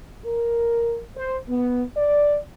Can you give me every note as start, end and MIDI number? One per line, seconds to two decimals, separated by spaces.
0.25 1.01 70
1.16 1.37 72
1.49 1.83 59
1.97 2.36 74